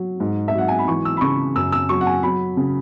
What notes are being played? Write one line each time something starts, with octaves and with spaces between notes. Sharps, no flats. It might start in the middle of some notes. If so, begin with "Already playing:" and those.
Already playing: F#3
G#2
E5
F#3 F#5
G#5
B5
E3 C#6
E6
B5
C#3 C#6
F#2 E6
E6
F#3 C#6
F#5
G#5
F#3 B5
C#3